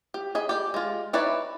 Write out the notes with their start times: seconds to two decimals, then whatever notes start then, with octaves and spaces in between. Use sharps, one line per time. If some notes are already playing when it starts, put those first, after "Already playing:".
0.14 G4
0.35 G#4 D#5 B5
0.49 G4 D5
0.74 G#3 F4
1.13 D#4 E4 B4 C#5 D5